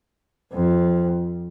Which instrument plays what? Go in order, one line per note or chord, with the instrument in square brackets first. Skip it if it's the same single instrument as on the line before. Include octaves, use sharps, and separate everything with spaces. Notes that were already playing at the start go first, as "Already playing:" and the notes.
[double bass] F2